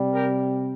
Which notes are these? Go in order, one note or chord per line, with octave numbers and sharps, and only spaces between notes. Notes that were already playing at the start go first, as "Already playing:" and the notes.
Already playing: C3 G3
G4 A#4